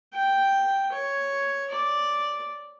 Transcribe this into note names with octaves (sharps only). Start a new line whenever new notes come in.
G5
C#5
D5